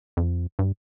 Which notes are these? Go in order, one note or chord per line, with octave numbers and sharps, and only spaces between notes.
F2
G2